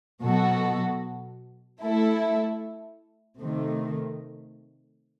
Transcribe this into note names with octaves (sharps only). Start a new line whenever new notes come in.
B2 F#3 B3 F#4 A4
A3 E4 A4
C3 D#3 A3